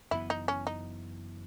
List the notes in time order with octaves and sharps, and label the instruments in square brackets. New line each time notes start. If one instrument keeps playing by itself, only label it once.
[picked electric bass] F#1 F#2 E3 B3 [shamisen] E4
[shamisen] D#4
C#4
D#4